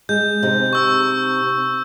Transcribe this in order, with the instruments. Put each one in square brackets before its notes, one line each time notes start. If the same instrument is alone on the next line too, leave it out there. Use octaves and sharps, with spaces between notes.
[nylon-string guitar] G#3 [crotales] G6
[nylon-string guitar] C3 D#4
[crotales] C#6 E6